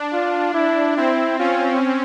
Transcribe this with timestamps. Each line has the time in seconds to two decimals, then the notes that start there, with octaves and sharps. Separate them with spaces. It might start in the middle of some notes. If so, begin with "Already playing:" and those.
Already playing: D4
0.13 F4
0.54 E4
0.96 C4 E4
1.39 C#4 F4